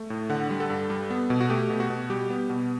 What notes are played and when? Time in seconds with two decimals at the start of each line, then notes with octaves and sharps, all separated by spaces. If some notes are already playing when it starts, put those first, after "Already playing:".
Already playing: A3
0.10 A2
0.30 D3 F#5
0.50 G3
0.60 A4
0.70 G2
0.90 G3
1.10 B3
1.30 B2
1.41 F#4
1.50 A3 G4
1.70 B2
1.80 F#4
1.90 B2
2.10 G3 G4
2.30 B3
2.50 B2